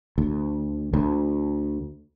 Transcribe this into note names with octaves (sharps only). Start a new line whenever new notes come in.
D2
D2